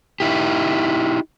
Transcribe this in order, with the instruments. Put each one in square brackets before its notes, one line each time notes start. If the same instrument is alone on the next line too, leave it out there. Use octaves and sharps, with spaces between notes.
[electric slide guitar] D#4 E4 G4